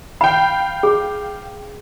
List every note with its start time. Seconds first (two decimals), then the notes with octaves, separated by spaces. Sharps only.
0.21 F5 G5 B5
0.83 G#4